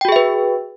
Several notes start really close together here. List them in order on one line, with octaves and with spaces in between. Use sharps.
G5 F#4 G#4 E5 B4